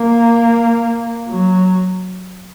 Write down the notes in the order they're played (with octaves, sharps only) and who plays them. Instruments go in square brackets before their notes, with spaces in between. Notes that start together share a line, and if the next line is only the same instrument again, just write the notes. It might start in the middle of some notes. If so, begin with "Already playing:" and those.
Already playing: [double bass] A#3
F#3